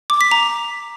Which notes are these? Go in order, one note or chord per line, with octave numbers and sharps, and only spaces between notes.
D6
B6
A#5